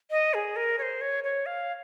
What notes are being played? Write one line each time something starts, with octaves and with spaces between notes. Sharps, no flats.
D#5
G#4
A#4
C#5
C5
C#5
C#5
F5